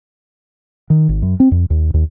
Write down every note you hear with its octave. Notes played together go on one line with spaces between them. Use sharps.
D#3
G#1
F#2
C4
F2
D#2
D#2